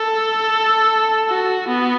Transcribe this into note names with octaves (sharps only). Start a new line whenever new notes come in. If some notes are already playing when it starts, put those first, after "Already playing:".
Already playing: A4
F#4
B3